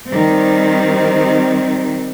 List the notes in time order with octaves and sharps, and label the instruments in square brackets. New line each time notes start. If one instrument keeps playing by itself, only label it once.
[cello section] D#3 G3 C4